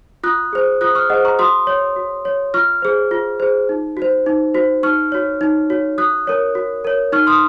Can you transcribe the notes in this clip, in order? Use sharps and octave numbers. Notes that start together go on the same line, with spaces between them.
F4 D#6 F#6
G#4 C5
F4 D#6 F#6
C#6 F6
G#4 C5 D#5 F#5
A#5 C#6
F#4 C6 D#6
C#5
F#4
C#5
F4 C#6 F6
G#4 C5
F4
G#4 C5
D#4
F#4
C5
D#4
F#4 C5
D#4 C#6 F6
F#4 C#5
D#4
F#4 C#5
F#4 D#6 F#6
A#4 C#5
F#4
A#4 C#5
D#4 C#6 F6
C6 D#6